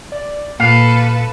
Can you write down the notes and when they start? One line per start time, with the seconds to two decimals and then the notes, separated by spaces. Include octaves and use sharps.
0.12 D5
0.60 A#2 A#3 A4 B4 F5